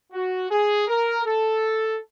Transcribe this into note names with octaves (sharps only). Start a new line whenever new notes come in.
F#4
G#4
A#4
A4